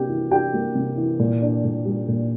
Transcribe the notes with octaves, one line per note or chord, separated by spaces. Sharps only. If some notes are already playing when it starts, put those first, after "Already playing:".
Already playing: C3 A#3 D4 G4 G5
E3
D4 G4 G5
A#3
C3
E3
A#2
D4
A#2
G3
A#2